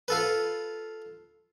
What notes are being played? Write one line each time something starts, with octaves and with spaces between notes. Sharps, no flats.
F4 A4 B4